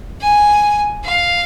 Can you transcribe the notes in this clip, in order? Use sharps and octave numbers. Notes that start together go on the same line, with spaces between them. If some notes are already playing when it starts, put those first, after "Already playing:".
G#5
F5